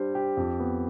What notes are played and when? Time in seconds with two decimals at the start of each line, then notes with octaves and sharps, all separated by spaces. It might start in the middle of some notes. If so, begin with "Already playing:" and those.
Already playing: G3 D4 C5
0.15 G4
0.37 F2
0.60 B3